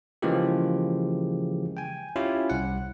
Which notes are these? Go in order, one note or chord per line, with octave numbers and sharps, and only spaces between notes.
C#3 E3 F3 G#3 A#3 G4
G5 G#5
C#4 E4 F4 G4
C2 F#5